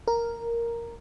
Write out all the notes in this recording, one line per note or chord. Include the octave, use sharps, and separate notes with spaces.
A#4